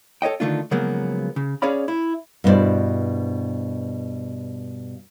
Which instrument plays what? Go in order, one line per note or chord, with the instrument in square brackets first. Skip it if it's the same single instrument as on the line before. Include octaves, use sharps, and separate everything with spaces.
[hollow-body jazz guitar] A4 C#5 D#5 G5
D3 D#3 A3 D4 F4
C#3 F3 F#3 G#3 A#3 B3
C#3
C#4 G#4 C#5 D5 F5 B5
E4
[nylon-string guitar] G2 B2 D#4 E4 C5 D5